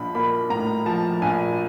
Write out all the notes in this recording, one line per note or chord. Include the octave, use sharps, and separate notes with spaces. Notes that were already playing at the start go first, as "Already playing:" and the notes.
Already playing: A#1 F3 B5
A#3 B5
A2 A#5
F3 A5
A#1 G#5